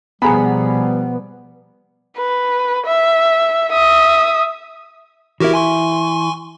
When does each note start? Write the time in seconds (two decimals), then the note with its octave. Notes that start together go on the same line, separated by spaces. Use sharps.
0.22 B2 F3 G3 B3 G#4 A#5 B5
2.17 B4
2.86 E5
3.72 E5 D#6
5.40 E3 E4 F#4 G4 A#4
5.54 G#5 C6 C#6